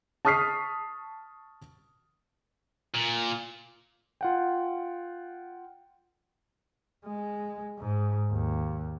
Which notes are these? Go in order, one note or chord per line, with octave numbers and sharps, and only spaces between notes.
A5 C#6 D#6 F6 B6 C7
A#2
F4 F#5 G5
G#3
G#2
D#2